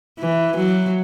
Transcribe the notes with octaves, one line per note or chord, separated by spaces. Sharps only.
E3
F#3